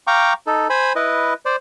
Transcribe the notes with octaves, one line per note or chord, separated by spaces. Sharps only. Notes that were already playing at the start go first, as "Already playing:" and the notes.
F5 G5 A#5 C#6 D6
D#4 A4
C5 G#5 B5
E4 B4 D#5
C5 D5